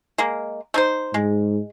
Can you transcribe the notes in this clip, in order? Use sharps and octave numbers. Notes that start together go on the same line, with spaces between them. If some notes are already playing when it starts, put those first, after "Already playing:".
G#3 A#3
A3 D#4 C5
G#2 G#3